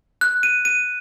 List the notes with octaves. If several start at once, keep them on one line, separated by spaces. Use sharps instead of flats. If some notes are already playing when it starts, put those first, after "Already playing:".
F#6
D#7
D#7